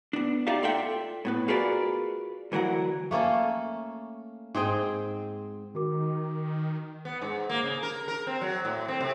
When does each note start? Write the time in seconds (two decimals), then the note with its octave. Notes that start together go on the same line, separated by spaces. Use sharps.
0.13 B3 D4
0.47 D#4 F4 G4 D5 E5 F5
0.63 F4 A4 D5 E5 F#5 G5
1.25 A2 B3 B4
1.48 F4 F#4 G#4 A#4 B4 D5
2.52 D2 E3 F#3 A#4 F#5
3.11 A3 A#3 C#4 A4
4.55 G#2 C4 G#4 G5
5.75 D#3 F#4 A#4 D6
7.05 B3
7.21 G#2
7.49 A#3
7.63 C#3
7.83 A#4
8.08 A#4
8.27 C4
8.41 F#3
8.65 A2
8.88 C4
9.01 C3